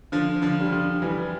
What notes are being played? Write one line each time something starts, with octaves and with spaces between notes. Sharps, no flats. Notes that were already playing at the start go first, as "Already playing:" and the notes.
D3 F3
D3 F3
G3
D3 F3
E3 G3